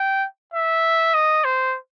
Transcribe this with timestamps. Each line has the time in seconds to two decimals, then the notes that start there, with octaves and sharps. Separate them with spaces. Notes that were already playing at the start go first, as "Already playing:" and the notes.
Already playing: G5
0.54 E5
1.14 D#5
1.44 C5